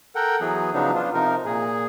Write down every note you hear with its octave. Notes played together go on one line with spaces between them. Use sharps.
A4 A#4 F#5 G5
E3 F#3 B3 G#4
C#3 F3 F#3 B3 D4 D#4
B3 D4 F4
C3 F3 D#4 A#4
A#2 G#4